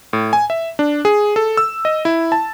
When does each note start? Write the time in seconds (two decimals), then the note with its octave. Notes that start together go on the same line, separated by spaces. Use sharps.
0.13 A2
0.33 G#5
0.50 E5
0.79 D4
1.05 G#4
1.36 A4
1.57 E6
1.85 D#5
2.05 E4
2.32 A5